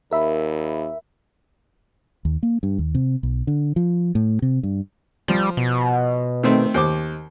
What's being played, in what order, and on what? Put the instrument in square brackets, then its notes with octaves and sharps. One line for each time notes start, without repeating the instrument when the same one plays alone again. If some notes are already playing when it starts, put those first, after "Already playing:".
[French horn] D#2 [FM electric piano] A#4 E5 B5
[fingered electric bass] D#2
A#3
G2
D#2
C3
B1
D3
F3
A2
C3
G2
[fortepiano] F3 [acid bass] G3
[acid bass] B2
[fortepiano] D#3 A3 C4
D#2 C5 D6